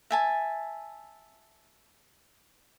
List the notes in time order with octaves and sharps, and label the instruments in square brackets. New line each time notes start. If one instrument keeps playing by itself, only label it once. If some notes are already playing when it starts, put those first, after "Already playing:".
[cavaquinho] E5 G#5 A5